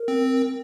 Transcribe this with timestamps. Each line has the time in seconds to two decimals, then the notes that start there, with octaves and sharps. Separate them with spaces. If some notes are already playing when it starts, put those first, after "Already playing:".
Already playing: A#4
0.08 C4